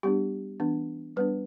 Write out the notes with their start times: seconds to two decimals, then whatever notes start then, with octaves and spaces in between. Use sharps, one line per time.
0.03 G3 B3 D4 G4
0.60 E3 B3 D4
1.16 G3 B3 D4 B4